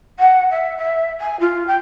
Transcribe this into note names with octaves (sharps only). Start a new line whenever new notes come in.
F#5
E5
E5
G#5
F4
G5